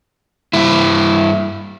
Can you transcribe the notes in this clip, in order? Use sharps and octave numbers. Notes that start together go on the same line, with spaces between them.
G2 E4